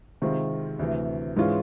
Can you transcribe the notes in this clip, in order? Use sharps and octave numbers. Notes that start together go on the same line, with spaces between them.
C3 D#3 G#3 C4 F4
D2 C3 E3
G#2 E3 G#3 C#4 F4